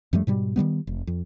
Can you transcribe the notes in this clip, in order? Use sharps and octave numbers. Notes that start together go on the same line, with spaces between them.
F#2 F3 G3 A3
G#2 B2 G3
D#3 F3 G3 B3
F1
F2